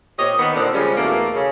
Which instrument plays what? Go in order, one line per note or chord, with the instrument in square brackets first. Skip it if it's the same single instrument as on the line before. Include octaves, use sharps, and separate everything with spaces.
[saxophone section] A#2 C4 G4 C#5 D#5
D#3 B3
A#2 D3 C4 D4
C#3 F3 G3 G#3 C#4
E2 B2 A3 A#3
C#3